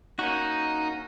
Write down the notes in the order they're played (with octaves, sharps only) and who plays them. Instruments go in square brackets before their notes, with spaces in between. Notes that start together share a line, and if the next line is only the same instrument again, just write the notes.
[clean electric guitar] A#3 C#4 F#4 [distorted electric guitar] D#4